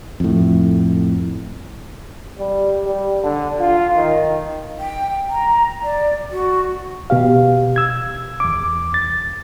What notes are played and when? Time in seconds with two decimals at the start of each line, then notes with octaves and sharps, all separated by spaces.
0.20 F2 A2
2.39 G3
2.86 G3
3.24 D3
3.60 F4
3.97 D#3
4.79 G5
5.29 A#5
5.82 D5
6.31 F#4
7.10 B2 G4 F5
7.76 E6 G#6
8.40 E2 D6
8.94 A6